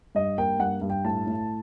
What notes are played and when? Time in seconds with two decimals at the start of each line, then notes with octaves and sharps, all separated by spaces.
0.15 G2 D#5
0.38 A#3 G5
0.59 G2 F#5
0.81 G2
0.90 G5
1.04 A2 A5
1.27 A2